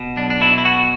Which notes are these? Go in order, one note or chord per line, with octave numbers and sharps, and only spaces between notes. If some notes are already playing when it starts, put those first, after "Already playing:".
Already playing: B2
B1 D4
D4
B2 E4
E4
B1 F#4